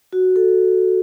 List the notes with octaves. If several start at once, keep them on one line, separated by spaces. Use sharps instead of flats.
F#4
A4